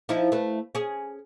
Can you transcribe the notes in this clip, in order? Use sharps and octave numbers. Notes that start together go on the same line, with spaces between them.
F3 D#4 E4
A3 B4
C#4 G#4